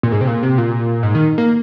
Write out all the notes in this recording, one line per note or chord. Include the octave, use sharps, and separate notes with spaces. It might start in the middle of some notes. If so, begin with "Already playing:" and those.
A#2
G#2
C3
A#2
C3
A#2
G#2
D#3
A#3